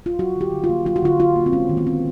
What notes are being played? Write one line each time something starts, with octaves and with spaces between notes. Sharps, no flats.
F4
F#3 F#4
D3 G4
D3
F4
A#3
F#3 F4
F#4
D3 F4
D3 F4
A#3
C4
G#3 C#4
D#3
B3
G#3 C4